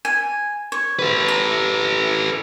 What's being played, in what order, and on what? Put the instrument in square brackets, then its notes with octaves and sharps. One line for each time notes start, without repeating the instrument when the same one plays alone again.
[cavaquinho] G#5
C#5
[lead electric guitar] A4 B4
[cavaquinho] A#5